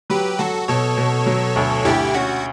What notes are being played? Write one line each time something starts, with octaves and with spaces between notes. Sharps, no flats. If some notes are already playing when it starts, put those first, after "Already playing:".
F#3 G4 B4
F#3 F#4 A4
B2 A4 C#5
B2
F#3
D2
D2 E4 G4
C#4 F#4